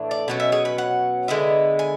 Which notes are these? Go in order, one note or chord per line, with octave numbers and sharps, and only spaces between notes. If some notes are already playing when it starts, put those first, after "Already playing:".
Already playing: A2 E3 A3 D4
D5
B2 F#3 C#4
E5
G#4
B4
F#5
D3 G#3 B3 E4
G#5